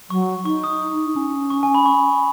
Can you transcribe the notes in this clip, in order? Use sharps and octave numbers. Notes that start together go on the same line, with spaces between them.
F#3 C#6
D#4 C#6
D#6
D#4
C#4
C#6
G#5
B5
C#6